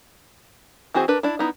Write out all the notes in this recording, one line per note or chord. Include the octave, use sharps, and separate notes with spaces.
E3 C4 F#4 G#4 C5
D4 A#4 B4
D4 E4
B3 D#4 E4